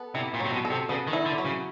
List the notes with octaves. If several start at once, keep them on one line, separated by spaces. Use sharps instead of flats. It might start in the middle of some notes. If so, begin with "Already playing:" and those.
Already playing: B3 A4
C3 E4
A#2
C3 F#3
B2
A4
C3
C#3 B3
D#3
E4
D3
F#3
C#3